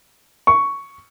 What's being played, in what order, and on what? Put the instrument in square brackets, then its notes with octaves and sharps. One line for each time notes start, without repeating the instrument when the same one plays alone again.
[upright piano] C#6